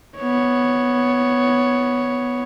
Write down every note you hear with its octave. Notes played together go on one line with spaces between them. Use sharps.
B3 C#5